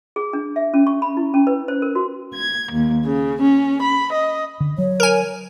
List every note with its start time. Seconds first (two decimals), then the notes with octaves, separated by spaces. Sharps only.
0.16 G#4
0.33 D4
0.56 E5
0.74 C#4
0.87 C#6
1.02 B5
1.17 E4
1.34 C#4
1.47 B4
1.68 C5
1.82 A#4
1.95 F#4
2.35 G#6
2.72 D#2
3.04 C#3
3.41 C#4
3.82 B5
4.11 D#5
4.60 D3
4.78 F#3 C#5
5.00 A#4 G#5